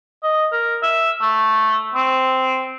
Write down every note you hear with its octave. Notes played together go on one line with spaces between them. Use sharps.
D#5
A#4
E5
A3
C4